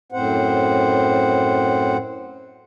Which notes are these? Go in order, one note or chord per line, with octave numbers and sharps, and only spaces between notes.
F#2 A2 C4 C5 F#5